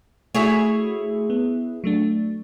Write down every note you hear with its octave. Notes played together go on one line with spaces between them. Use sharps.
A3 E4 F#4 G#4 C#5
B3
F#3 A3 D4